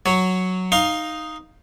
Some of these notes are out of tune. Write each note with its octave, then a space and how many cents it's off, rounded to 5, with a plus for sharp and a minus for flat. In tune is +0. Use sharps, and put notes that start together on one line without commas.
F#3 +0 C#5 +0
D#4 +0 F5 +0 C6 +25